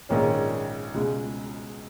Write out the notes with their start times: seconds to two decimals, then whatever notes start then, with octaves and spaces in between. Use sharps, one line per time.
0.09 A#1 G#2 D#3 A#3 C#4
0.94 C#2 B2 G#3